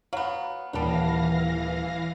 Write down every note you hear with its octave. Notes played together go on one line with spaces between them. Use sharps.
F#3 B3 F5
D#1 E3 G3 B3 F5 A5 A#6